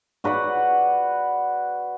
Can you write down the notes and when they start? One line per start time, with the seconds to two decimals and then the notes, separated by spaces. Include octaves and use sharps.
0.24 F#4 B4 D5 F#5